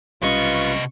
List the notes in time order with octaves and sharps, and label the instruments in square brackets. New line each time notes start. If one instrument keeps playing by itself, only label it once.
[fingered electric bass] B1 G3 C#4 [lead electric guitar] C3 D#5 [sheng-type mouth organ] F4 B4 [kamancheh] C#6